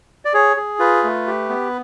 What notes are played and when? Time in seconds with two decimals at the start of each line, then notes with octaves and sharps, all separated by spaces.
0.25 D5
0.34 G#4 C#5
0.57 G#4
0.79 F4 B4
1.04 A3
1.27 G4
1.49 B3